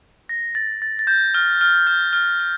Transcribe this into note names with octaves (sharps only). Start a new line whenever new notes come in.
A#6
A6
A6
A6
G6
F6
F6
G6
F6
F6